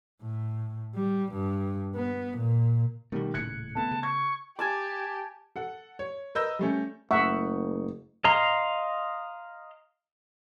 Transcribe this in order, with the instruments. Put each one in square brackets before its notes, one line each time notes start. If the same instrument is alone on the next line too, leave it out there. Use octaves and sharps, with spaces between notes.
[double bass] A2
G3
G2
B3
A#2
[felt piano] B2 D#3 G3 [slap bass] A3 B3
[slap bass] D#1 A2 C#3 [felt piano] F#6 G#6 C#7
[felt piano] A3 B3 [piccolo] A5
[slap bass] C#3
[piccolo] C#6 [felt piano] G#6
[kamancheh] G4 [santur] G#5 A5 D6
[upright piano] A4 F#5
C#5
A#4 B4 D#5 E6 G6 A#6
G3 A3 C#4
[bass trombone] F#1 [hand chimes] A3 [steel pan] E5 F#5 [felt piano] C#6
[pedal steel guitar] D#5 F5 A#5 C6